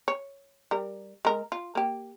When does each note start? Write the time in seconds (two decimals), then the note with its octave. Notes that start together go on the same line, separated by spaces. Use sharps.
0.08 C#5
0.71 G3 A#4
1.25 G#3 A#4
1.52 F4
1.75 A#3 G4